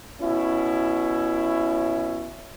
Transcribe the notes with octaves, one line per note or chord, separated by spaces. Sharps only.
B2 C#4 E4